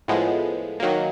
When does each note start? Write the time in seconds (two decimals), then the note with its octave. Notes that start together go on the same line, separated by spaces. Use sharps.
0.08 A2 F3 G#3 B3
0.80 D#3 F#3 A#3